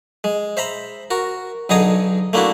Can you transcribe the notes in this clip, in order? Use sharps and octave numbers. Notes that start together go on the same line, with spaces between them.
G#3
C5 E5 A#5 B5
F#4 A#4
B1 D3 D#4 G#4 A#5 D#6
A3 A#3 D4 E4 F#4